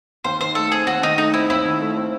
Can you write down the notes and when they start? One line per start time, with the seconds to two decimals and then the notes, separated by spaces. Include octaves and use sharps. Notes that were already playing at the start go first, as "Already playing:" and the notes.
0.24 D#2 C5
0.40 D#3 C5
0.55 A3 A4
0.72 C4 G#4
0.87 D#2 F#4
1.03 D#3 D#4
1.18 A3 D#4
1.34 C4 E4
1.49 D#2 E4
1.65 D#3
1.81 A3
1.97 C4